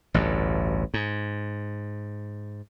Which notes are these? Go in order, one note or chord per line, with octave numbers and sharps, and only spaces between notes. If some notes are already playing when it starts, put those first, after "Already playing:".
A1 D2 G2
G#2